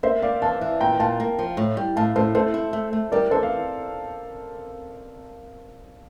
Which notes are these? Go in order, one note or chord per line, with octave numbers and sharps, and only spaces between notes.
A#3 C5 E5
A#3 D5 F5
E3 F5 A5
E3
A#2 G5 A#5
A#2 F5 A5
A#3
F3
A2
G3
A2 F5 A5
A2 A4 C5
A3 A4 C5
E4
A3
A3
G3 A#4 D5
E3 A4 C5
F5